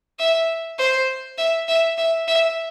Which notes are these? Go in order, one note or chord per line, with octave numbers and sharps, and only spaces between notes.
E5
C5
E5
E5
E5
E5